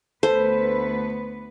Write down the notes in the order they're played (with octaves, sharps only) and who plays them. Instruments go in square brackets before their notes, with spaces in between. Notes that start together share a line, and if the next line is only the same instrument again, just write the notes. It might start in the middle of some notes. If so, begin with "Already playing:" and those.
[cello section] D2 B3 B4 [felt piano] A4 [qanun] C5